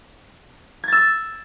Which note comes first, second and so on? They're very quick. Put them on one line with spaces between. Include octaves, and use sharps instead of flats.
G#6 A6 E6